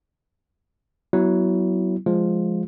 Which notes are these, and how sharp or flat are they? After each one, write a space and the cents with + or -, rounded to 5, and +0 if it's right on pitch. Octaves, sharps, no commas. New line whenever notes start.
F#3 +20 B3 -5 E4 +0
F3 +0 G#3 +0 F4 +0